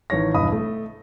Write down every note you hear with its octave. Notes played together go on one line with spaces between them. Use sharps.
A1 D#3 C#5 A#6
E1 G2 D#5 B5 D#6
A3